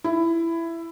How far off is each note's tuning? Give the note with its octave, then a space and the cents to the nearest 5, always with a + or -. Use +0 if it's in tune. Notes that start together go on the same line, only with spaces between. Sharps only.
E4 +15